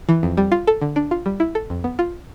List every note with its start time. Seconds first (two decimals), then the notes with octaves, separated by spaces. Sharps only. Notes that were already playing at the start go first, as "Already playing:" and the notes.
0.09 E3
0.23 F2
0.37 G3
0.52 F4
0.67 A4
0.81 D3
0.96 D4
1.11 F4
1.26 G3
1.40 E4
1.55 A4
1.70 F2
1.84 B3
1.99 F4